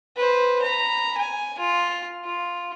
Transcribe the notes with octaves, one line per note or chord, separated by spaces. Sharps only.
B4 C5
A#5 B5
G#5
F4
F4